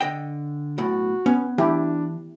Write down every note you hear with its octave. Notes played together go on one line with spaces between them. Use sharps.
D3 D#5 G5
B1 A2 F#4
B3 C#4
E3 D4 E4 G4